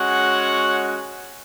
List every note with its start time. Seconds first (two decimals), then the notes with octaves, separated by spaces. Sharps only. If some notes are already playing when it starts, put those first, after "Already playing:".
Already playing: G#3 C#4 F#4 C#5 F#5